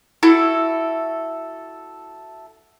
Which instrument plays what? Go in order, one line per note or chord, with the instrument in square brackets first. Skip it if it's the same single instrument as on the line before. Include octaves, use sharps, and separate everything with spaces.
[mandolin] E4 F#4 A4